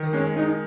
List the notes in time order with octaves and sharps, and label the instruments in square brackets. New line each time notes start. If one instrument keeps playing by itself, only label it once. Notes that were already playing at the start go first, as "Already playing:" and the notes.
Already playing: [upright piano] D#3
[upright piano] G#3 [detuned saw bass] C#4
[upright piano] G#3 [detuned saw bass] D#4